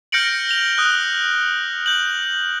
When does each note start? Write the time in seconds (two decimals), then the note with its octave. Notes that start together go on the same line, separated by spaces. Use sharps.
0.12 F6 G6 A#6 C#7 D7 F#7
0.49 F7 G7
0.78 D#6 F#6
1.86 G6 F#7